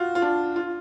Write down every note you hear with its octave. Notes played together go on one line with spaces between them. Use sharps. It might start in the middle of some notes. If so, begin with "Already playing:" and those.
Already playing: F4 F#4
F4
D4
F4